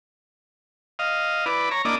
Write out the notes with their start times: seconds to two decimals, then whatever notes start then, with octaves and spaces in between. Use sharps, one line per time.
0.99 D#5 F5
1.46 E4 B4 D5
1.71 C#5 A#5
1.85 A#3 D4 E4 D5 D#5